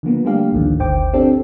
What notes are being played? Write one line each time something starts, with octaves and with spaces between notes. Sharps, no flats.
D3 F3 A#3 B3
G3 A3 A#3 D4 G4 F5
A1 D2 D3 D#3 F3
G1 D2 C5 G5 D6
C4 D4 G4 A4